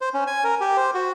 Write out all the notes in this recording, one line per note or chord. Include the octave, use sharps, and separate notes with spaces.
C5
C#4
G#5
A#4
G4
C5
F#4